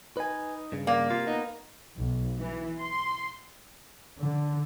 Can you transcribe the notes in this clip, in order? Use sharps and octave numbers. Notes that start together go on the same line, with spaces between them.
D#4 B4 G#5
G2 C#3
A#3 D5
C3 F4
B3 D#4
B1
E3
C6
D3